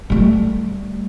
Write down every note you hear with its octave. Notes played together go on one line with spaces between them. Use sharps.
G3 A3